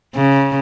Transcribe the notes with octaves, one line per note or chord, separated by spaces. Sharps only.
C#3